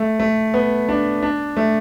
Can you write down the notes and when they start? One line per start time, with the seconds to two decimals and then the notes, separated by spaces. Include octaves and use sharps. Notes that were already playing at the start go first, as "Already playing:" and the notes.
Already playing: A3
0.20 A3
0.54 B3
0.89 D4
1.23 D4
1.57 A3